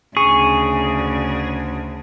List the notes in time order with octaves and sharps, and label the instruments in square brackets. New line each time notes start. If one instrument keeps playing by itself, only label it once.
[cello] D2 C#3 [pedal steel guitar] G#4 [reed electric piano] C#6